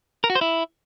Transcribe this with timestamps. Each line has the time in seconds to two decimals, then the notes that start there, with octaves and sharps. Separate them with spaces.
0.24 A#4
0.30 F#4
0.35 C5
0.41 E4